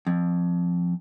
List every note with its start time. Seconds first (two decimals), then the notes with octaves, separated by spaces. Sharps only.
0.07 F2